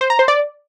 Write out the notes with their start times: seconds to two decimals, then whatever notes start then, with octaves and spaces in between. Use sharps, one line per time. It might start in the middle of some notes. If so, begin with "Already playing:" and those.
0.01 C5
0.10 A#5
0.19 C5
0.28 D5